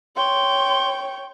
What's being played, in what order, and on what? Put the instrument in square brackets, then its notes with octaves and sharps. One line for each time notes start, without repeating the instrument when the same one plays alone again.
[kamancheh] C#5 G5 [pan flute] C6